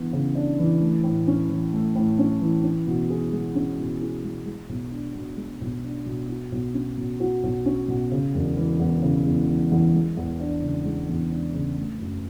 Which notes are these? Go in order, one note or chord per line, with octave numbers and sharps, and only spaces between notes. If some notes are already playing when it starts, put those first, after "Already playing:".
Already playing: E3 B3 D4
C#3
D4
E3
A3
A2
C#4
E3
A3
A2
C#4
E3
C#4
B2
G#4
G#3
C#4
B2
G#4
G#3
G#3
B1
D4
B2
G#3
B1
D4
B2
F#3
B1
C#4
B2
F#3
B1
C#4
B2
C#3
E1
E3
E2
C#3
E1
E3
E2
G#3
E2
D4
C#3
G#3
E2
D4
C#3
A3
F#2